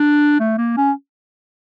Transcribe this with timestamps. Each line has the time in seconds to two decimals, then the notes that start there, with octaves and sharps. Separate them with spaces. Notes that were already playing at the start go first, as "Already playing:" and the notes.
Already playing: D4
0.40 A3
0.58 A#3
0.77 C#4